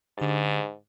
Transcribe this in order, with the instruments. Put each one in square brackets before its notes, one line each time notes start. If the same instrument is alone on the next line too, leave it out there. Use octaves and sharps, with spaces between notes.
[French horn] G#2 [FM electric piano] D3 G4 A6